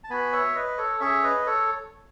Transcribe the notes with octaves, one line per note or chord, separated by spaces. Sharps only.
A5
B3 F#4 G#5 B5
C#5 E5
B4 D#5
A4 C#5
C#4 G#4 C#5 E5
B4 D#5
A4 C#5